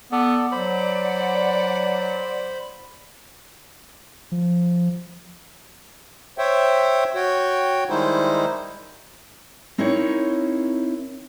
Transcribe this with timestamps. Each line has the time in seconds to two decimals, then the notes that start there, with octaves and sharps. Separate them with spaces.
0.12 B3 A4 D5
0.52 F#3 C5 D5 F#5 B5
4.32 F3
6.38 C5 C#5 E5 G5
7.15 F#4 C#5 G5
7.90 D#3 G3 G#3 D#4 E4 C5
9.78 C4 D#4 E4 A#4 C#5